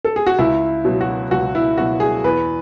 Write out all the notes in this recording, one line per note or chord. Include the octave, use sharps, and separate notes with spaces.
A4
G#4
F#4
C#2 E4
B2 F#3
F#4
C#2 F#4
E4
B2 F#3 F#4
G#4
E2 B4